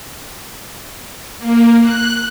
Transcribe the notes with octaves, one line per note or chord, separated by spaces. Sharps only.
A#3
F#6